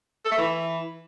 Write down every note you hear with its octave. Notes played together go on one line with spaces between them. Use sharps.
A4
A3
E3